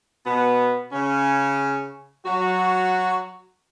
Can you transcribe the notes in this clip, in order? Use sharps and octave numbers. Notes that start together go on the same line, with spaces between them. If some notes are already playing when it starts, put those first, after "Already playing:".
B2 B3
C#3 C#4
F#3 F#4